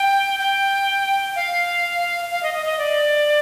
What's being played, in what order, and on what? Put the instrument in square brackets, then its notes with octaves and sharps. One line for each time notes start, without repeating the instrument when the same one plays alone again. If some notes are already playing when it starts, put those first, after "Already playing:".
Already playing: [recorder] G5
G5
F5
F5
D#5
D#5
D#5
D5